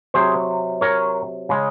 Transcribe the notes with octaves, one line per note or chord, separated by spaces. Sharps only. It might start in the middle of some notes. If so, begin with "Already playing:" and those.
C3 F#3 G#4 C5
A#4 C#5
C#3 G#3